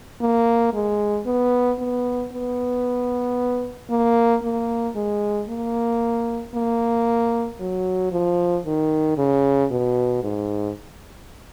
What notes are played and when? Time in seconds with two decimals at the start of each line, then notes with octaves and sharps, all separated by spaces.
0.21 A#3
0.73 G#3
1.26 B3
1.79 B3
2.32 B3
3.90 A#3
4.43 A#3
4.95 G#3
5.48 A#3
6.54 A#3
7.60 F#3
8.12 F3
8.65 D#3
9.17 C#3
9.70 B2
10.23 G#2